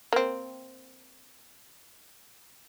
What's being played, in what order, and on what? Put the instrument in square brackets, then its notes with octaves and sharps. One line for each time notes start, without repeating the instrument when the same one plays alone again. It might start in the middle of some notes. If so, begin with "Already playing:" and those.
[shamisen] A#3 C4